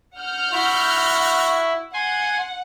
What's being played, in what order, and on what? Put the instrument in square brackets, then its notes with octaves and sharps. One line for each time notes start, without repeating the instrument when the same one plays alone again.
[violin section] F#5 F6 G6
[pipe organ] E4 [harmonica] F#4
[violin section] F#5 [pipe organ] G#5 C6